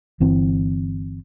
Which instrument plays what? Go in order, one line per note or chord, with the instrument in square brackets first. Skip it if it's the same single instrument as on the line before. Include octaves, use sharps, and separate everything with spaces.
[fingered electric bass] G1 E3 C4